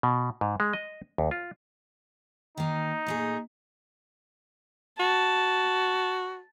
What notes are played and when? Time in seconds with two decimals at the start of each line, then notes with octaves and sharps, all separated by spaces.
0.03 B2
0.41 G#2
0.60 G#3
0.73 D#5
1.18 D#2
1.31 F4
2.57 D#3 A#3 D#4
3.07 A#2 A3 G#4
5.00 F#4 A5